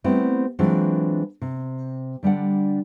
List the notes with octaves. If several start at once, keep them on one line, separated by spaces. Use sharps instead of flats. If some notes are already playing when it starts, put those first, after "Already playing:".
G3 A3 B3 C4 E4
E3 F#3 G#3 C4 D4 F4
C3
D3 G3 D4 F#5